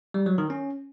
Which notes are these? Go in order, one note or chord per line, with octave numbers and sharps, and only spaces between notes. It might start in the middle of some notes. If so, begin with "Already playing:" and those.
G3
F#3
D#3
C#4